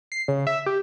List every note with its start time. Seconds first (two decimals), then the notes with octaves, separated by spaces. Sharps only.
0.12 C7
0.28 C#3
0.47 E5
0.66 G4